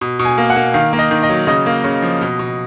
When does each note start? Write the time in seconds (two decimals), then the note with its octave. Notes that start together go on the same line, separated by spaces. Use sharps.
0.01 B2
0.19 B2
0.25 G#5
0.38 A#3
0.50 F#5
0.56 A#3
0.74 D#3 F5
0.93 A#3
0.99 D#5
1.11 D#3
1.23 D#5
1.30 F#3
1.47 C#3 D#5
1.66 A#3
1.84 C#3
2.02 F3
2.21 B2
2.39 B2